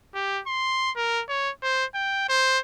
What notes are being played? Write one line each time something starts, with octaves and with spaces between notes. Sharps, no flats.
G4
C6
A#4
C#5
C5
G5
C5